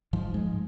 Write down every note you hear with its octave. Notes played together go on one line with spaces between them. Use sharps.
G#2 F3
G#2 G#3